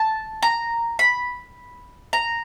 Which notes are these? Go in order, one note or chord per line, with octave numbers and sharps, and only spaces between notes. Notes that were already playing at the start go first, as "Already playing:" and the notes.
Already playing: A5
A#5
B5
A#5